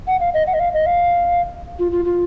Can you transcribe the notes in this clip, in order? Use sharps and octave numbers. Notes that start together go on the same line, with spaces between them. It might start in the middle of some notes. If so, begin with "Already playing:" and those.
F#5
F5
D#5
F#5
D#5
F5
D#5
F5
F4
F4
F4